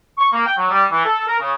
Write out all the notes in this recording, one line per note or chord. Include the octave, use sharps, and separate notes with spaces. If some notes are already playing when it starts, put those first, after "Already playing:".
C#6
A#3
G5
F#3
G3
E3
A4
A#4
C#3